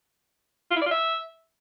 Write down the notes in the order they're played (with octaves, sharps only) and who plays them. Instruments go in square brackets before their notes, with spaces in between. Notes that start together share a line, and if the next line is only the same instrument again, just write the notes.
[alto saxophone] F4
E4
D5
F4
E5